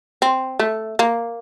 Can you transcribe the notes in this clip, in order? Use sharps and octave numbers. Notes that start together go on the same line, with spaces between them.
C4
A3
A#3